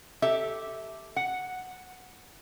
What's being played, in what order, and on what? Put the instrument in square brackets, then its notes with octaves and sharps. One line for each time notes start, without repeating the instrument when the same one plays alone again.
[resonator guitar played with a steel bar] G4 A4 E5
F#5